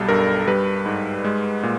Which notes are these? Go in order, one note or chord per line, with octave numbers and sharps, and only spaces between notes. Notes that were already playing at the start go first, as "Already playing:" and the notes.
Already playing: B1 G3 A4
G2 A#4
G3 B4
G#2
G#3
A#2